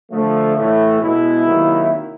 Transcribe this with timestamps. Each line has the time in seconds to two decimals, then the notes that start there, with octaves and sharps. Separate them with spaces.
0.11 D3 F3 A3
0.56 A2 E3 A3
1.00 B2 G#3 B3 E4
1.45 C3 D#3 F#3 A#3